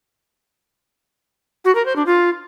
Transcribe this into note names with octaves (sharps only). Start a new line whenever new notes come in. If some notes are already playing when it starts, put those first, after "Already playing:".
F#4
A#4
C5
D4
F4